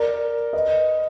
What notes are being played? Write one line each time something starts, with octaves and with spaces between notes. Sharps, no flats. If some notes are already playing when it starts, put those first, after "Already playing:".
Already playing: A#4 D5
B4 D#5